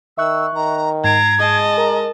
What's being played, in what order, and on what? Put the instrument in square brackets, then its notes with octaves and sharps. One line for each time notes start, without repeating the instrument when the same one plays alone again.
[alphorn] D#3 [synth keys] E5 C#6 F#6 [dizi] E6
[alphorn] D#3 [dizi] A#5
[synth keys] G#2 C7 D7 [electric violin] A#5 [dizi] G#6
[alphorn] G#3 [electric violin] D#5 A5
[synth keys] A#4 [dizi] A#5